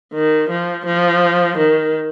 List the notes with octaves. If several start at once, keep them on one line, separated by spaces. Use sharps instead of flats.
D#3
F3
F3
D#3